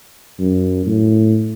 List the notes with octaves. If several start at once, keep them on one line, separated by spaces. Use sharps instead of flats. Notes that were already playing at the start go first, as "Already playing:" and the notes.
F#2
A2